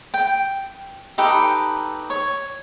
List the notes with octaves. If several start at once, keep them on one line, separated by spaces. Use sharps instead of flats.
G5
D#4 G4 A4 B4
C#5